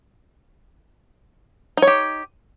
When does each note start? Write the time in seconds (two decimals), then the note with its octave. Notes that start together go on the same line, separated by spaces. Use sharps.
1.77 D#4
1.82 C#5
1.87 G4